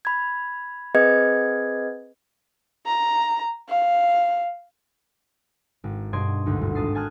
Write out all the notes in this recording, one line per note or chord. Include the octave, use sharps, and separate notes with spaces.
B5 G#6
C4 G#4 B4 D#5 G#6
A#5
F5
G#1
G2 B2 D5 D#5 C6 G#6
G#1 D2 D#4
G1
G#1 A5 D#6 A6 C7
G#5 A5 D#6 F6 F#6 G#6